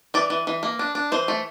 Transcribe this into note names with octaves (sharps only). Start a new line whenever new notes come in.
E3 D5
E3
E3
A#3
D4
D4
E3 C5
A3